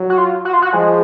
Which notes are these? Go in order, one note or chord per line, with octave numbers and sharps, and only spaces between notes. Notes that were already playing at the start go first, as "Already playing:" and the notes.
Already playing: F#3
F#4
F4
F#4
F4
F#4
F3 G#3